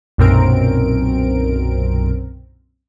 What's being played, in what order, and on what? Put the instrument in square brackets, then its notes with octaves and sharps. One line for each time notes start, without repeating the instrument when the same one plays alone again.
[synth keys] B1 F#2 A#2 C4 A#4 D7